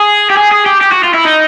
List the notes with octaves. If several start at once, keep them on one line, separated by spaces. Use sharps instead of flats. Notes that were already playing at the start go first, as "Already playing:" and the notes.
Already playing: G#4
G4
G#4
G#4
G4
G4
F#4
F4
E4
D#4